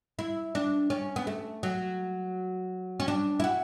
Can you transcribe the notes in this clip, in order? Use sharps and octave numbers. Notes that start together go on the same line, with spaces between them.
E4
D4
C#4
B3
A3
F#3
C#4
D4
E4
F#4